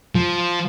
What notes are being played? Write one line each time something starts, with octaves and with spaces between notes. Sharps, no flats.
F3